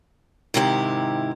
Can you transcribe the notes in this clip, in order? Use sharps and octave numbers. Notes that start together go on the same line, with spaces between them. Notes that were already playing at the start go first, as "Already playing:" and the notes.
G#2 C3 D#3 E4 F4 G4